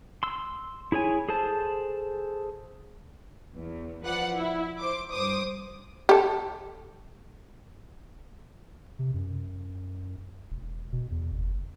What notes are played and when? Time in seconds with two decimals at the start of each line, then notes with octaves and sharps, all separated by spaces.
0.23 C6 E6
0.92 E4 G#4 C#5 G#5
1.29 G#4 A4 C5 A5
3.56 E2
4.03 F3 B4 D5 F#5 F#6
4.34 E4
4.78 C5 D6
5.11 G2 C5 D6 D#6
6.09 G4 A4
8.99 C3
9.14 F#2
10.51 E1
10.92 B2
11.11 E2
11.31 F#1